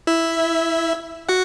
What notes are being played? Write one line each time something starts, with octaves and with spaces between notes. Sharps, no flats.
E4 E5
F#4 F#5